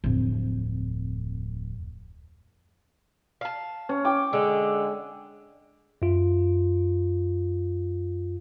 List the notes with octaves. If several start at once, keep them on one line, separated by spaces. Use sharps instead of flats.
D1 F2
F5 A5
C#4
G5 D6
D3 G#3
F#2 F4